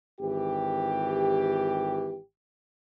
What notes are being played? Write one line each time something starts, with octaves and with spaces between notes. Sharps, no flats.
G#1 E3 G4